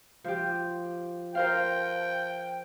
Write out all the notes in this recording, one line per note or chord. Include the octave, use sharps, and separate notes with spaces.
F3 G4
A#4 C5 F5 G5